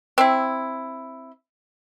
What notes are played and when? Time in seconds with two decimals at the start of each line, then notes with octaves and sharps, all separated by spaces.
0.18 C4 E4